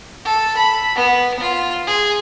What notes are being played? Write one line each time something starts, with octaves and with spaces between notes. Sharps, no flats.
A4
B5
B3
F4
G#4